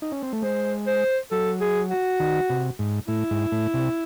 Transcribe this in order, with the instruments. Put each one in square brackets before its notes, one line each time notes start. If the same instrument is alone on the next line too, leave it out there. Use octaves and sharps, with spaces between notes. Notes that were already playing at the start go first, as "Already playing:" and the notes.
[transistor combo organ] D#4
C#4
C4
A3
[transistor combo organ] G#3 [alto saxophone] C5
[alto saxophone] C5
[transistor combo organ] F#3 [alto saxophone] A4
[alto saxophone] G#4
F#4
[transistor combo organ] D#3
C3
G#2
[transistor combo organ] A2 [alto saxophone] E4
[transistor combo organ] G#2
A2
C3